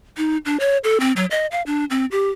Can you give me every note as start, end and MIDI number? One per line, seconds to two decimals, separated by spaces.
0.17 0.37 63
0.45 0.57 62
0.60 0.77 73
0.84 0.98 69
1.00 1.12 60
1.16 1.25 54
1.31 1.46 75
1.52 1.62 77
1.66 1.85 62
1.90 2.05 60
2.12 2.30 67